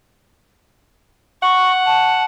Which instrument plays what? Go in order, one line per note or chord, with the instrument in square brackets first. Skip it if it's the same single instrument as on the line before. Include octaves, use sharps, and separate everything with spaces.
[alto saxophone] F#5 [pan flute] C#6
[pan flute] A5